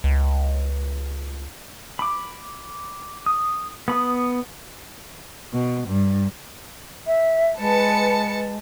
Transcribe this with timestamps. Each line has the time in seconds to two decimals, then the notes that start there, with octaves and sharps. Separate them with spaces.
0.04 C#2
1.99 B5 D6
3.26 D#6
3.88 B3 B5 D#6
5.53 B2
5.88 G2
7.06 E5
7.58 G#3 B4 A5 C#7